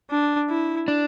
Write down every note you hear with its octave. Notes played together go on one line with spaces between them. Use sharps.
D4
E4
D4